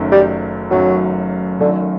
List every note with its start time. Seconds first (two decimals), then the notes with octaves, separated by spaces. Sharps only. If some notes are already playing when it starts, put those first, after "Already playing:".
Already playing: F#1 F#2 D#3 A3
0.12 G3
0.71 F#1 F#2 D#3 F#3 A3
1.59 F#1 F#2 D3 D#3 A3